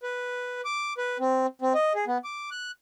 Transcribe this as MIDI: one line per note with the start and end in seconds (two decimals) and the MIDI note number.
0.03 0.61 71
0.65 0.93 86
0.98 1.18 71
1.20 1.46 60
1.62 1.73 60
1.74 1.93 75
1.95 2.05 68
2.07 2.18 59
2.24 2.50 86
2.51 2.71 90